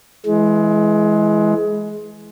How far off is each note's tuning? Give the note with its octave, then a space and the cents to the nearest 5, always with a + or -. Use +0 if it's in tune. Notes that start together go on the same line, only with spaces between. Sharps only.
E3 +0 G#3 +20